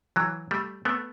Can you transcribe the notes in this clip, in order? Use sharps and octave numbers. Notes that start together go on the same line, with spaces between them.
E3 F#3
G3 A3
A3 B3